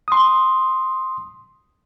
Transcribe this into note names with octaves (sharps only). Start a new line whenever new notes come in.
C6 D#6